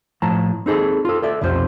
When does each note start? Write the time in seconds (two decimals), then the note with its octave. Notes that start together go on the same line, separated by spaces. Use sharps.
0.22 A2 F3 A5 A#5
0.66 C4 D#4 G#4 A4
1.05 F4 A4
1.22 A4 D5 E5
1.41 B1 F2 C3 F3 C5